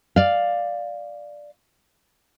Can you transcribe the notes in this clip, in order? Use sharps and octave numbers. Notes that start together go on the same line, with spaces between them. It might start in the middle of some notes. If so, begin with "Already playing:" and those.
D5 F5